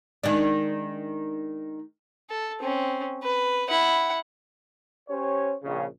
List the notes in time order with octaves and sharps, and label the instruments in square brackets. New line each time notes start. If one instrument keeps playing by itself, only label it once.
[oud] D#3 G#3 D4
[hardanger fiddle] A4
C4 C#4
B4
E4 F#5
[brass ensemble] C#4 G4 C5 C#5
A#1 C#3